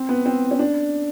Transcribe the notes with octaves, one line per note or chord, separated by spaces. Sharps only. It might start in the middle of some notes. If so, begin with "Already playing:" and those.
Already playing: C4
B3
C4
C#4
D4